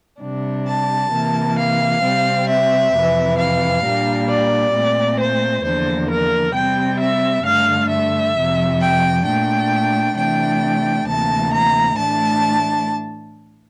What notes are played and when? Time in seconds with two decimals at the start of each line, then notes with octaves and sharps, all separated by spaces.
0.22 C3 G3 D4
0.67 A5
1.12 C3 E3 A#3
1.58 F5
2.03 C3 G3 C4
2.48 E5
2.93 F2 C3 E3
3.38 F5
3.83 A#2 G3 A#3 D4
4.28 D5
4.74 A#2 A3 C4
5.20 C5
5.64 E2 D3 F3 A#3 C5
6.10 A#4
6.55 C3 G3 C4 G5
7.00 E5
7.45 G2 D3 A3 F5
7.91 E5
8.36 F2 C3 F3
8.81 G5
9.26 A#2 A3 D4 G5
10.16 C3 E3 A3 D4 G5
11.06 D2 C3 E3 A#3 A5
11.52 A#5
11.97 A2 E3 A3 D4 A5